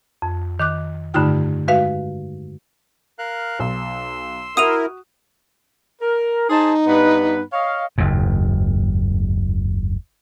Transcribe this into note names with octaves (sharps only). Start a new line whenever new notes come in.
F2
D#3 D6 F#6
G2 D3 A3 D#4 F4 G5
G#3 F#4 B4 E5 F5
A#4 F5 F#6
B1 C6 E6
E4 F#4 A#4 D#6 D#7 F7
A#4
D#4 G#4 C5 A5
G2 B3 B4
C#5 D#5 F5
F#1 D#2 G#2